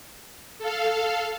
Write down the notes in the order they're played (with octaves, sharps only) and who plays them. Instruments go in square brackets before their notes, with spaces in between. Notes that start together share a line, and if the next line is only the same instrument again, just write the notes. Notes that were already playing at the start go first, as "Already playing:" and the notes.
[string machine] A4 F5